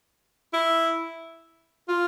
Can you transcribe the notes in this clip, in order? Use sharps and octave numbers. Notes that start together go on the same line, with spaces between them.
E4
F4